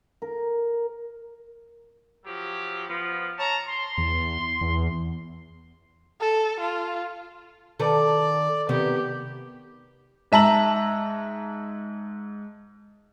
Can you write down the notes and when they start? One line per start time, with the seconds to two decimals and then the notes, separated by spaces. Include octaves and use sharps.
0.22 A#4
2.25 F3 F#3 G4
2.88 F3 B3
3.38 C#5 A5 A#5
3.67 C6
3.98 E2
4.61 E2
6.21 A4
6.60 F4
7.80 D#3 A4 B4 D5
8.69 C3 D#3 B3 G4
10.32 G#2 E5 A5 A#5 F#7